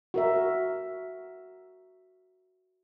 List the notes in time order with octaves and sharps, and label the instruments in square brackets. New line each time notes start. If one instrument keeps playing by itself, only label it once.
[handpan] F#4 A#4 E5